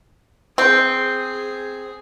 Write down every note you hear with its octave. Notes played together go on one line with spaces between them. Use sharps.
C4 G#4